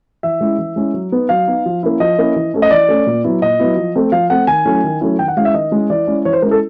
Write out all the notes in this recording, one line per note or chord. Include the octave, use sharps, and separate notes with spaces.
E3 E5
G#3 C#4 E4
E3
G#3 C#4 E4
F#3
B3 D#4
F#3 F5
B3 D#4
F3
A#3 C#4 E4
F3 D#5
A#3 C#4 E4
E3
A3 C#4
D#5
E3 D5
A3 C#4
A#2
F#3 B3 E4
A#2 D#5
F#3 B3 E4
F3
A3 C4
F3 F5
A3 C4 F#5
D#3 G#5
F#3 A3 C#4 E4
D#3
F#3 A3 C#4 E4
D#3 G5
F#5
G#3 C#4 E4 F5
E5
D#3 D#5
G#3 C#4 E4
E3 D5
G#3 C#4 E4
E3 C#5
C5
G#3 C#4 E4 A#4
A4